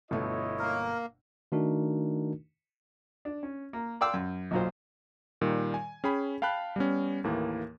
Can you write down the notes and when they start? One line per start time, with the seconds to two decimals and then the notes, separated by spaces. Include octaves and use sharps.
0.11 G1 B2 A3 E4 C#5 D#5
0.59 A#3 A#4
1.52 D#3 A3 D4 D#4 F#4 A#4
3.25 D4
3.43 C#4
3.73 A#3
4.01 D5 F5 G5 C6 D6 E6
4.14 F#2
4.51 B1 A#2 F#3 F4 C5
5.41 A#2 D#3 G3
5.74 G#5
6.04 C#4 G#4 G5 B5
6.42 F5 G5 A5 B5 F#6
6.76 G3 B3 C#4
7.24 D#2 A2 E3 A#3